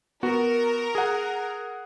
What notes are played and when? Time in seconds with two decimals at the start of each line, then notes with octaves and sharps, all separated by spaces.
0.23 B3 F#4 A#4
0.95 G#4 F#5